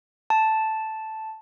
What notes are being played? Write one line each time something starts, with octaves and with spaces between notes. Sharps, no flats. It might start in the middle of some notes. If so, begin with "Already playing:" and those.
A5